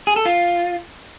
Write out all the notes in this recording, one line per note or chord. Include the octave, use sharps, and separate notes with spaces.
G#4
A4
F4